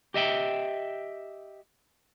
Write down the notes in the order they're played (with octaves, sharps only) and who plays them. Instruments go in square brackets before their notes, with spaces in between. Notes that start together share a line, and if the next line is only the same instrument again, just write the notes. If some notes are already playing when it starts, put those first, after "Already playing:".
[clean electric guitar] G4 D#5 E5 G5